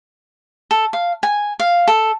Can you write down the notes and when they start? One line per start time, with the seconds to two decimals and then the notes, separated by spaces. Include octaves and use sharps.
0.71 A4
0.93 F5
1.23 G#5
1.60 F5
1.88 A4